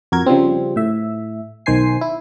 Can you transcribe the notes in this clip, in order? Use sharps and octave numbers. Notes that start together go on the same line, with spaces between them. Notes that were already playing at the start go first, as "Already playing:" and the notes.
F2 F#4 A#4 G#6
C#3 F3 G3 C4
A2 E5
B1 D#3 C5 G#5 C7
E4